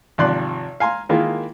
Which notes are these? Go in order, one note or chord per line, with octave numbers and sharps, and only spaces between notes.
G#1 C3 F3 D5 C6 F#6
F5 G#5 A#5 C6
D#3 G#3 A#3 E4 F4